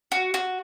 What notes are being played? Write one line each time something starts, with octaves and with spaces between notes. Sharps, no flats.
F#4
F#4